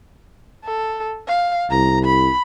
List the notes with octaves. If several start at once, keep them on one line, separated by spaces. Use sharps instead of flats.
A4
F5
C2 A#5
B5